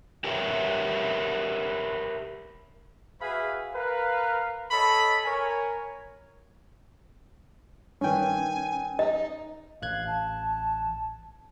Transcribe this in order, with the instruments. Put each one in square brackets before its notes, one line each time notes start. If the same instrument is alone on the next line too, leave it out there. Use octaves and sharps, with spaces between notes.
[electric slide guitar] G4 A#4 B4 C#5 E5
[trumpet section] F#4 G#4 B4 E5 F5 B5
A#4 B4 F5
A4 C#5 D#5 B5
A#4 C#5 G#5
[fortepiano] G2 D#3 B4 [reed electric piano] C#4 G5 [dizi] G#5
[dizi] D#4 [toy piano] D#5
[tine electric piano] A1 F#6 G#6 [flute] F5
[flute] A5